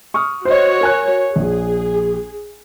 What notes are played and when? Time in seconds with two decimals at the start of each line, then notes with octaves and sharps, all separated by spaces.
0.14 C#6 D#6 F6
0.45 F#4 C5 C#5 D#5
0.81 A#4 G#5 F#6
1.36 A#1 G#4